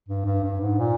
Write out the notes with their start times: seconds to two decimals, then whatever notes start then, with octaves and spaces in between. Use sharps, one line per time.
0.08 G2
0.26 G2
0.44 G2
0.61 G#2
0.79 A#2